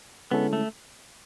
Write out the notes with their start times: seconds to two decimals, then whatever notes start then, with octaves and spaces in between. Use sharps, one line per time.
0.31 D3 G#3 B3 C#4 E4 A4
0.53 A3